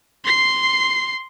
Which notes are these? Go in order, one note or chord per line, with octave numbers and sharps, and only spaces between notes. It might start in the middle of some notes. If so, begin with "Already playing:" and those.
C6 C7